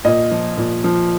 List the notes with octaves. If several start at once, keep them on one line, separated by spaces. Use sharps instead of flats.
A#2 D#5
F3
A#2
F3